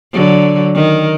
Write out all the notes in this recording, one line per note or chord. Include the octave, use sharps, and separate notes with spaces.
D3 F#3
D#3